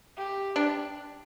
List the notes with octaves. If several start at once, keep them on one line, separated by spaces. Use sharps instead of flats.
G4
D4